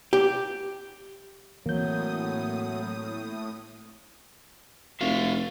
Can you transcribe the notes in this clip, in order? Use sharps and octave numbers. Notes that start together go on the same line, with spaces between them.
G4
A2 E3 F#3 A#3 C4 D#6 G6
F1 F#4 E5 F5